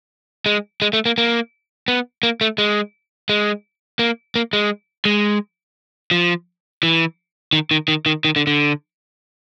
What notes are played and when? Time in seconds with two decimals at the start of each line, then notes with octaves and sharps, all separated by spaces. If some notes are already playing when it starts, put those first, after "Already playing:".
0.46 G#3
0.82 G#3
0.93 A3
1.06 A#3
1.18 A#3
1.88 B3
2.23 A#3
2.41 A3
2.58 G#3
3.29 G#3
3.99 A#3
4.36 A#3
4.53 G#3
5.05 G#3
6.11 F3
6.83 E3
7.53 D#3
7.71 D#3
7.88 D#3
8.06 D#3
8.25 D#3
8.36 D3
8.47 D3